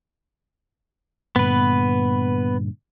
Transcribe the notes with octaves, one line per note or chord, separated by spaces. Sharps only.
G2 A#2 D3 B3 B4